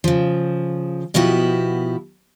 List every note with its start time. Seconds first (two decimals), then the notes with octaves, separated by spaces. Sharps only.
0.04 C#3 F3
1.14 B2 F3 B3 E4 F#4 G4